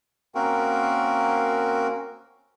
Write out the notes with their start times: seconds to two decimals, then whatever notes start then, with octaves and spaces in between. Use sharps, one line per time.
0.35 A#3 C4 C#4 F#4 A#4